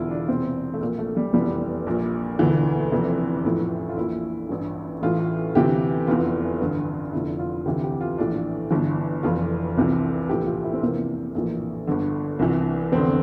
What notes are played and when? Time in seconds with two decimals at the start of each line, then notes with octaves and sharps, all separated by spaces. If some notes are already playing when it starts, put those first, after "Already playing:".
Already playing: E1 E2 D3 E4 F4
0.11 D4
0.28 E1 E2 C3 E3 C4
0.74 A3
0.80 A#1 A#2 A#3
0.99 A3
1.17 G3
1.33 F1 E2 E3 G3
1.86 A#1 A#2
2.39 E1 D2 D3 E3
2.92 F1 F2 C3
3.44 A1 A2 E3 F3
3.89 F4
3.97 A#1 A#2 E4
4.49 A1 G2 E3
5.02 A1 A2 E3 F4
5.55 D2 C3 E3 G4
6.07 F1 E2 E3 F4
6.61 A1 G2 D3
7.13 F1 F2 D3 E4
7.39 F4
7.65 D2 C3 E3 G4
7.84 G4
8.01 F4
8.18 A#1 A2 E3 D4
8.71 G1 G2 E3
9.23 F1 F2 E3 F4
9.77 C2 C3 E3
10.29 A#1 A2 E3 G4
10.47 F4
10.64 E4
10.73 C4
10.82 F1 E2 C3 E3 A#3
11.35 A#1 A2 E3 A#3
11.87 G1 G2 D3
12.39 C2 C3 E3
12.92 F1 E2 D3 C4